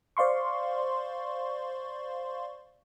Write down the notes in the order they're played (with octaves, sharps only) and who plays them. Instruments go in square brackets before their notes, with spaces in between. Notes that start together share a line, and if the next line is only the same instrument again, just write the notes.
[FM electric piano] C5 D5 F5 C6 C#6